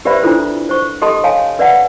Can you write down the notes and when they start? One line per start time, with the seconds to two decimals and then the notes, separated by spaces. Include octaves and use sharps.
0.05 G4 B4 C5 D5 E5 B5
0.23 D4 E4 F4 A4 C5
0.69 C5 C#6
1.02 G4 A4 D#5 A5 C6 D#6
1.24 C#5 F5 G#5 A5
1.59 B4 D5 E5 F#5 A5